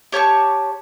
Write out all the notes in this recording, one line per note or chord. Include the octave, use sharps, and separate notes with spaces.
G4 C#5 A5 C#6